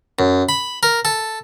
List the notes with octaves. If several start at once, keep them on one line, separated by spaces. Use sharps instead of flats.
F#2
B5
A#4
A4